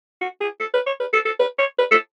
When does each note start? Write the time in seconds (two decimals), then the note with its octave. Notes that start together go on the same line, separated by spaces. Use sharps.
0.21 F#4
0.41 G#4
0.60 A4
0.74 B4
0.87 C#5
1.00 B4
1.13 A4
1.25 A4
1.39 B4
1.59 C#5
1.78 B4
1.91 A4